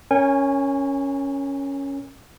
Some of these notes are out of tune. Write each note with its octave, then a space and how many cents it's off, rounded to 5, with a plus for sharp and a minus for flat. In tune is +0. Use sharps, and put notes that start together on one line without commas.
C#4 +0 A#4 +0 G#5 -30